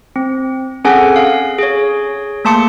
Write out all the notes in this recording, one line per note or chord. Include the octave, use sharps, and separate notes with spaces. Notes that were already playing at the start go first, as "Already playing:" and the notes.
C4
C4 C#4 G#4 A4 F#5 G#5
F5
G#4 C#5
A3 A#3 A5 C6 D6 C#7